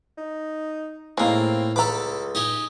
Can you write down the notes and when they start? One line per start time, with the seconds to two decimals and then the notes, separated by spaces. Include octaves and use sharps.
0.17 D#4
1.18 A2 G#3 A#3 C4 D#4
1.76 C#2 A4 B4 A#5 B5 D6
2.35 D#4 G4 G#5